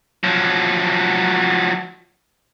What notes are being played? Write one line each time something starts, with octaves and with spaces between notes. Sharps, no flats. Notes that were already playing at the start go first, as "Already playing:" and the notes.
F3 F#3